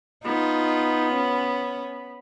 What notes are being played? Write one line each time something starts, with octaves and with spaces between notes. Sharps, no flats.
B3 D#4 F4
C#4